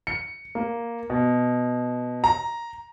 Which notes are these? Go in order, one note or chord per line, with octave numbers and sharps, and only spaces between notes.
C#7
A#3
B2
A#5